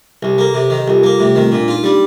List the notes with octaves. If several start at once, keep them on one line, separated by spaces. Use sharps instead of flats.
C2 G4
A#3 A4
C3 A#4
D#3 G4
C2 F4
G3 A#3
C3 A3
C4
D#3 A#3
A#2 D4
D#4 F4
G3 D4